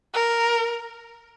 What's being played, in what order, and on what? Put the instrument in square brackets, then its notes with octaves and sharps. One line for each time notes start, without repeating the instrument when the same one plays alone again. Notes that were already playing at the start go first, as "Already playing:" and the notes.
[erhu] A#4